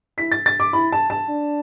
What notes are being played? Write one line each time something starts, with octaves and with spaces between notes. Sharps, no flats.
E4 B6
A6
A6
D6
E4 B5
A5
A5
D4